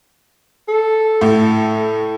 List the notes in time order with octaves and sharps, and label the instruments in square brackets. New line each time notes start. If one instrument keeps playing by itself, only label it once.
[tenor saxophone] A4
[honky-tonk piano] A2